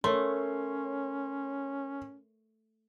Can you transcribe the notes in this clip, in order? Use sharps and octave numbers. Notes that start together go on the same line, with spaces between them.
A3 C#4 A#4 C#5 C6